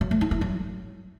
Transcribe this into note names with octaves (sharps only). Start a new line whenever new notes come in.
F#3
A3
D#4
E4
F#3